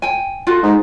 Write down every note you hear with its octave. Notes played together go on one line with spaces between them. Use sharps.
G5 G#5
F4 F#4 A4
G#2